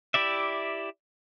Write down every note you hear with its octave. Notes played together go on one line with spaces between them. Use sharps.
E4 G4 D5 E5